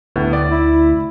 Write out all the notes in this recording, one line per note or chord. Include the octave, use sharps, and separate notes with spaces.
D2 A2 B3
D5
E4